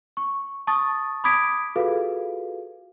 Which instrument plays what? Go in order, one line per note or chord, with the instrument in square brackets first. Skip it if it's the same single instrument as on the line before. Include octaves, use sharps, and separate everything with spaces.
[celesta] C#6
A5 C#6 D#6 A6
B5 D6 D#6 G#6 B6 D7
F4 F#4 G#4 A4 B4 F5